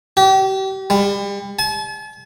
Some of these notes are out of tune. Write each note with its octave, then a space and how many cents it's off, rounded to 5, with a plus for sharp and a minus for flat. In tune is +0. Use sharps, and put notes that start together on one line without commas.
G4 -35
G3 +35
A5 -45